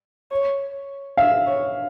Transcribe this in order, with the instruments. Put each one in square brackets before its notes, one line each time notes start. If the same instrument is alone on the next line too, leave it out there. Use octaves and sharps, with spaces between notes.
[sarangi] C#5
[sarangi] E5 [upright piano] F5
[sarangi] C#5